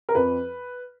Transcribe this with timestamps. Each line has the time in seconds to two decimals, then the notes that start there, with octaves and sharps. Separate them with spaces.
0.09 A#4
0.15 F2 B4